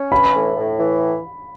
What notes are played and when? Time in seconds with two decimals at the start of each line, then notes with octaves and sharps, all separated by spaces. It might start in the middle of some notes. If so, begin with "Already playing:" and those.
Already playing: C#4
0.12 E3 B5
0.34 A2
0.56 A2
0.78 E3